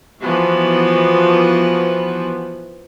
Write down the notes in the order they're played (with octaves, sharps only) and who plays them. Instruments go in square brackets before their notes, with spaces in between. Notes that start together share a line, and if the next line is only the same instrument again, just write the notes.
[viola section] E3 F3 B3 F#4